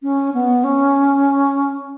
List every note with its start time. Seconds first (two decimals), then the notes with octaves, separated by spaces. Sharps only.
0.03 C#4
0.34 B3
0.64 C#4